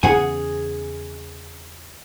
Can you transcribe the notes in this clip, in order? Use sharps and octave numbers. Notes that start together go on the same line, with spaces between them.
E2 C#3 B3 G#4 F#5 G#5